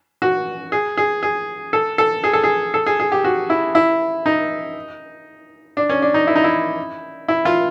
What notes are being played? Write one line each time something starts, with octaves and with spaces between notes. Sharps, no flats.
F#4
G#4
G#4
G#4
A4
A4
G#4
A4
G#4
A4
G#4
G#4
G4
F#4
E4
E4
D#4
D4
C#4
D4
D#4
E4
D#4
E4
E4
F4